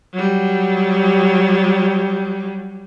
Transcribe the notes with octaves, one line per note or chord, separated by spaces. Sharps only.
F#3 G3